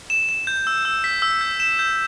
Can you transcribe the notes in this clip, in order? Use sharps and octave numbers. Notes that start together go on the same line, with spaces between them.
E7
E7
G6
E6
E6
B6
E6
G6
E7
G6